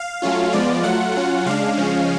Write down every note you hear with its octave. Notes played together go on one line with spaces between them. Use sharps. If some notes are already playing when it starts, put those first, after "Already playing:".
Already playing: F5
F#3 A3 C#4 F4
F3 G#3 B3 F4 D5
F#3 A3 F4 F#5
F#3 C#4 F4
C#3 G#3 D4 F5
C#3 F3 G#3 C#4